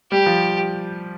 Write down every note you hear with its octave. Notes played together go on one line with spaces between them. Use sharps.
G3 G4
F3